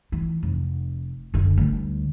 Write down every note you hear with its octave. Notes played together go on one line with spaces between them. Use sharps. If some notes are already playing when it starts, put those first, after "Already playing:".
E3
F1
F#1 D3
D2 G3